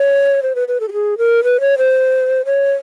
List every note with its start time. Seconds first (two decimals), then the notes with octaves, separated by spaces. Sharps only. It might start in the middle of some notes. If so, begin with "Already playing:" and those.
Already playing: C#5
0.43 C5
0.55 B4
0.68 B4
0.80 A4
0.88 G4
0.92 G#4
1.18 A#4
1.44 B4
1.61 C#5
1.78 C5
2.46 C#5